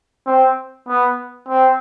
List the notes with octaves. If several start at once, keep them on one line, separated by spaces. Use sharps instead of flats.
C4
B3
C4